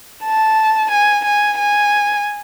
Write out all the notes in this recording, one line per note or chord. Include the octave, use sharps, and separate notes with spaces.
A5
G#5
G#5
G#5